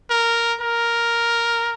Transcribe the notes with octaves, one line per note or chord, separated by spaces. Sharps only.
A#4
A#4